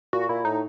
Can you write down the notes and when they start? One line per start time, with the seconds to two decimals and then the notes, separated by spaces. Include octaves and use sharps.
0.13 A#2 F#4
0.29 A#2 E4
0.44 A2 D#4